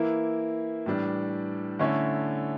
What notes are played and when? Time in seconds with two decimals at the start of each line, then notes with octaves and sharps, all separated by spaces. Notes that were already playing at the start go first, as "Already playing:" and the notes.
Already playing: E3 A#3 E4
0.86 A2 E3 G3 D4
1.79 D3 A3 C#4 E4